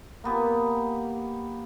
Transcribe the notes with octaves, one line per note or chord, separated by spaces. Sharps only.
A#3 B3 G4